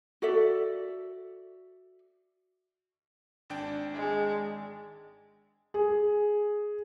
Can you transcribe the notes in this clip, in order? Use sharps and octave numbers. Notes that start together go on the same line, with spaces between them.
F#4 A4 D5 E5
G#1 D4 G5
G#3
G#4